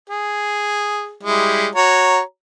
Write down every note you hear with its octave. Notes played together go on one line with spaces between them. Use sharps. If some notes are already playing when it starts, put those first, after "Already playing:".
G#4
G3 G#3 E4
F#4 C#5 A#5